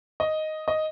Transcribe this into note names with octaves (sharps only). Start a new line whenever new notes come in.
D#5
D#5